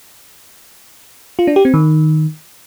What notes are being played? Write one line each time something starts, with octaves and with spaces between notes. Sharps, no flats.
F4
D4
G4
C4
D#3